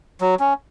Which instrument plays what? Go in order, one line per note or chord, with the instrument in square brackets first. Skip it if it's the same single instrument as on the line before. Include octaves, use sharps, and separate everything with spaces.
[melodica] F#3
C#4